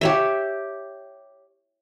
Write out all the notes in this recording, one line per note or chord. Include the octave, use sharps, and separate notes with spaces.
G4 C#5 E5